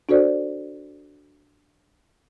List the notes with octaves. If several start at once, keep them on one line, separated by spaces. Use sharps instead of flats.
D4 F#4 A4 C5 D5